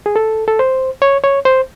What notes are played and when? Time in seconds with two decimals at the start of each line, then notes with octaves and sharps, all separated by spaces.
0.06 G#4
0.16 A4
0.48 A4
0.59 C5
1.02 C#5
1.24 C#5
1.45 C5